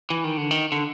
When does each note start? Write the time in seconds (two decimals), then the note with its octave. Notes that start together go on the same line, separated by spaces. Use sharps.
0.10 E3
0.24 D#3
0.37 D3
0.51 D#3
0.72 D3